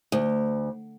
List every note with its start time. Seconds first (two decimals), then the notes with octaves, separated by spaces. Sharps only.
0.12 D2